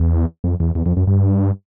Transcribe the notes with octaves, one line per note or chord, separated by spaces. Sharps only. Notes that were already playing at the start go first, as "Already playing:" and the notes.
Already playing: E2
F2
E2
E2
F2
F#2
G2